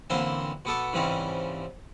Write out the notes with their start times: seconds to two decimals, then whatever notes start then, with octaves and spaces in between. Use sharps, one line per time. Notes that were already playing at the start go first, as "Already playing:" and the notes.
0.10 A1 D3 A#3 C4 E4 C6
0.65 B2 B3 A4 D6
0.93 G#2 C#3 E3 G3 C4 C#4